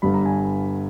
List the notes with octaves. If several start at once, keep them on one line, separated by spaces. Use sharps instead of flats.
G1 G2 G3 B5
A#5
G#5